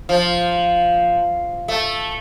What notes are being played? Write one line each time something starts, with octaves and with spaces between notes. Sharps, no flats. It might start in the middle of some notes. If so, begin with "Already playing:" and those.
F3
A3